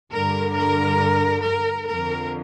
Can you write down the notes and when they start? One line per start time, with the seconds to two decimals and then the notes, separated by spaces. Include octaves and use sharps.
0.13 G2 D3 A#4
0.57 A#4
1.45 A#4
1.88 F2 D3 A#4